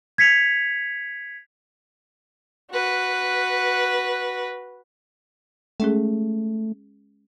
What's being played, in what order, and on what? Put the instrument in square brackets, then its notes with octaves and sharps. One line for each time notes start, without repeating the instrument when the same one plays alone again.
[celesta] G#6 B6 C#7 F7
[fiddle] F#4 B4
[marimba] G#3 C#4 G#4 [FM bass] A3